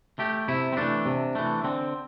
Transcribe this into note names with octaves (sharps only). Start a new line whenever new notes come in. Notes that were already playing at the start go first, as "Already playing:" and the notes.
A3 G4
C3 E4
C4
E3 A3 D4
C3
E3 A3
D3 C4